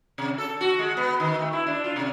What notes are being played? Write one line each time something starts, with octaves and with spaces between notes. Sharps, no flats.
C3
A4
F#4
G#3
B3
D#3
A3
E4
D4
F4
C3